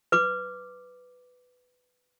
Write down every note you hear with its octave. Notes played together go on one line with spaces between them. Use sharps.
B4 D6